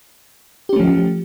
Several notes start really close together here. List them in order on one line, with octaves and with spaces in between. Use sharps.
G4 C#4 A3 F3